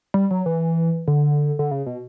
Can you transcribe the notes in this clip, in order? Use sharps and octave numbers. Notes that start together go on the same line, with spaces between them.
G3
F#3
E3
D3
D3
C#3
B2